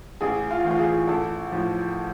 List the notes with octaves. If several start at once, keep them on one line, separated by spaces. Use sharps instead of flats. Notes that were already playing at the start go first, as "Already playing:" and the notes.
A1 G#4
F4
A2 E3
F4
G#4
A1 A4
A2 F3